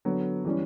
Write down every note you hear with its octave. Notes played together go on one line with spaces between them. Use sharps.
D3 F#3 B3
E3 G3 C#4